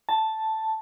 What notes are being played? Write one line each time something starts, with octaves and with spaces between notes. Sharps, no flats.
A5